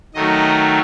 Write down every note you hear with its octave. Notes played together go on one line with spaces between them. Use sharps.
D#3 F#3 A3 D#5